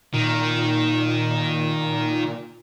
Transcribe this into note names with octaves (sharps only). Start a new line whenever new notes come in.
A#2 D#3